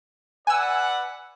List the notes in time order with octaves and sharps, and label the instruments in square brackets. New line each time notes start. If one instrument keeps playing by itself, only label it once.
[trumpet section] B4 D5 F#5 [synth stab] G#5 E6